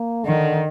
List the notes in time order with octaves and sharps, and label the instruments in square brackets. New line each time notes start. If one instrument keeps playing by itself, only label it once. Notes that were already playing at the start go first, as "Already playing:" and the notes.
Already playing: [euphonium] A#3
[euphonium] D3 [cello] D#3